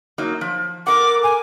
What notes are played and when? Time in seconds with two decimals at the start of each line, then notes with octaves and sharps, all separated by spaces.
0.18 F#3 A#3 D#4
0.41 F3
0.87 A4 A#4 F#5 D6
1.24 G#5